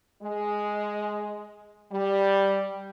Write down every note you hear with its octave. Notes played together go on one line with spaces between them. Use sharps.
G#3
G3